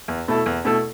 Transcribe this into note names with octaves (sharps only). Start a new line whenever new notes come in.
E2
B2 A3 E4 A4
E2
B2 A3 E4 A4